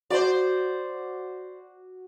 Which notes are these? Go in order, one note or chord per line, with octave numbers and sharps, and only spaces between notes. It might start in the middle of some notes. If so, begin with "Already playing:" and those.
F#4 C5 D5 D6